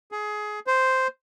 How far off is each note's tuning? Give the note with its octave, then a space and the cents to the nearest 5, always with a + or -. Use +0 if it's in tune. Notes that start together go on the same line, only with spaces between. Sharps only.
G#4 +20
C5 -5